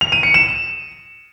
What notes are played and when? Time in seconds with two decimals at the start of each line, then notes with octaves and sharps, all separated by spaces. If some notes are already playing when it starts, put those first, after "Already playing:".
0.01 F7
0.12 D#7
0.23 C#7
0.34 E7